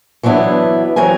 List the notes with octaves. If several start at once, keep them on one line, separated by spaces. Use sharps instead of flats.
E3 F#3 B3 D4 E4
E3 F#3 C4 A#4 G#5